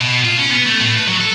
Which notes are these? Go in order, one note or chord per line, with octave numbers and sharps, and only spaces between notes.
B2
F4
C#4
B3
A3
A2
B4
F#3
A4